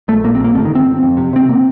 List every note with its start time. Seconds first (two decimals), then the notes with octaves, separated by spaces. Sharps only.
0.08 A#1 A3
0.24 A#1 A#3
0.35 C4
0.39 A#1
0.44 A#3
0.55 G1 A3
0.65 D#3
0.70 G1 C4
0.86 G1
1.02 F2
1.17 C3
1.33 C3 C4
1.49 A#3